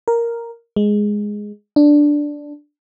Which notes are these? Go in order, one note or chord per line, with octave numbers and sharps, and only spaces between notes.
A#4
G#3
D4